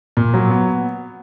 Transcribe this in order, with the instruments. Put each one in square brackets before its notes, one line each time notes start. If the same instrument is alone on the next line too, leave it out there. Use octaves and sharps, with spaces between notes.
[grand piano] A#2
F#3
B3